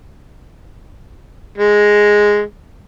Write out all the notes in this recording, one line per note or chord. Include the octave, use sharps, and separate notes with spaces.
G#3